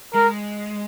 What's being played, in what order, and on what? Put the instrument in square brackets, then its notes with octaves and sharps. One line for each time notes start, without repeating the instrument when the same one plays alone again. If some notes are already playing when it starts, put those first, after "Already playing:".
[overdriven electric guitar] G#3 [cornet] A#4